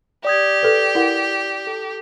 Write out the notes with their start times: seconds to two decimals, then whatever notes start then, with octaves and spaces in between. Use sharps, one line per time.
0.25 G4 D5 D#6 G#6
0.62 A4 B4
0.95 E4 A#4 F#5
1.67 A4